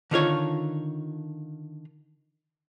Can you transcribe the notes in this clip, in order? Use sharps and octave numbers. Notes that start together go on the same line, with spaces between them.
D3 D#3 F4 C#5